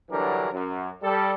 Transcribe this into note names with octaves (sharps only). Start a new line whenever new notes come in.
D3 E3 F#3 G3 D4 A#4
F#2
G3 A4